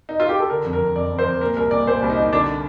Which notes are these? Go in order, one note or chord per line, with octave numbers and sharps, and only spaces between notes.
D#4
F4
G4
A4
D3 A#4
F2
A#4
F2
F2 D5
F2
C5
F2
A#2 A#4
C2 A#4
A#2 D5
A#2 C5
C2
D#4
C2
D3 D4